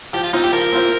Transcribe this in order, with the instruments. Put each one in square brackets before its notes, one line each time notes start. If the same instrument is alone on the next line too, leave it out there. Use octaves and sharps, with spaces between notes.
[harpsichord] F3 [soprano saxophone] G4
[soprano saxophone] F4
[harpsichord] C4 F4 C5 [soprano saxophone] D#4
[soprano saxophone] G4
[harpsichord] F3 [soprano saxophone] A#4
[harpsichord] C4 F4 C5